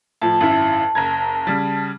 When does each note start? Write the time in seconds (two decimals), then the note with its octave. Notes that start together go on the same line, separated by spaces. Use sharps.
0.22 A2 F3 A5
0.41 G#1 F#2 E4
0.95 F#1 A#5 G#6
1.47 C#3 G3